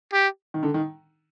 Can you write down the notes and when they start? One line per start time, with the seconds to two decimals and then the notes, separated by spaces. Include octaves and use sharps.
0.13 G4
0.54 D#3
0.63 D3
0.74 D#3